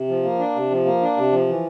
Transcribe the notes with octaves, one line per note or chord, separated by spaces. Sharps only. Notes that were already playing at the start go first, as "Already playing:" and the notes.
Already playing: C3
F3
A#3
D4
C3
F3
A#3
D4
C3
F3
E3